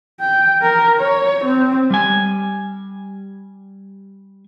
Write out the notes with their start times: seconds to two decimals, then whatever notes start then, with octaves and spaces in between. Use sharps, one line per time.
0.20 G5
0.62 A#4
1.00 C#5
1.44 C4
1.90 G3 G#5